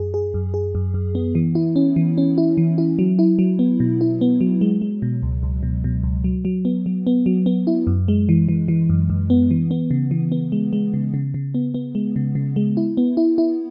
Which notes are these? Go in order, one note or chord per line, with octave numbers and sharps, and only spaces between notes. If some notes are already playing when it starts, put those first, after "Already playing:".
Already playing: F#2 G#4
G#4
F#2
G#4
F#2
F#2
B3
E3
E4
C#4
E3
C#4
E4
E3
E4
F#3
E4
F#3
B3
B2
E4
B3
F#3
G#3
G#3
B2
C#2
C#2
B2
B2
C#2
F#3
F#3
B3
F#3
B3
F#3
B3
E4
F#2
G#3
E3
E3
E3
F#2
F#2
B3
E3
B3
C#3
E3
B3
G#3
G#3
C#3
C#3
C#3
B3
B3
G#3
C#3
C#3
G#3
E4
B3
E4
E4